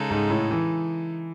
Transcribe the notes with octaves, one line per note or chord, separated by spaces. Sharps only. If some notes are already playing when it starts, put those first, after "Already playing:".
Already playing: C#3 G#3 D#4 A4
G#2
A2
E3